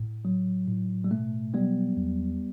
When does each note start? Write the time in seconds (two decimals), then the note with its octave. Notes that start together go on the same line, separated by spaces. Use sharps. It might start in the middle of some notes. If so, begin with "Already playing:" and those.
Already playing: A2
0.25 F#3
0.68 A2
1.04 G3
1.11 B2 A3
1.54 F#3 G3 B3
1.97 E2